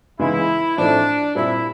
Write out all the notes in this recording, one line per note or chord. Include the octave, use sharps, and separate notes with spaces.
C#3 E3 G#3 B3 D#4 E4
A2 F3 A3 C4 D4 D#4
A#2 G3 C4 E4